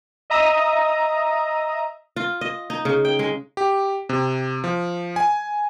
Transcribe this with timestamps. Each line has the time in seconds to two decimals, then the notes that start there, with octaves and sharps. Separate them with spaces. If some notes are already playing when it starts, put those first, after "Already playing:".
0.30 D#5 E5 A#5 D#6
2.16 F4
2.41 D#5
2.70 D#4
2.85 C#3
3.05 G5
3.19 G#3
3.57 G4
4.09 C3
4.64 F3
5.16 G#5